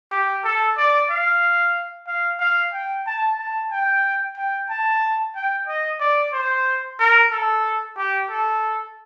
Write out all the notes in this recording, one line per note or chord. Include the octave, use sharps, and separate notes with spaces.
G4
A4
D5
F5
F5
F5
G5
A5
A5
G5
G5
A5
G5
D#5
D5
C5
A#4
A4
G4
A4